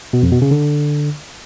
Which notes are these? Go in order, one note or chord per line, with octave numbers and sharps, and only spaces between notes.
B2
F2
B2
C#3
D3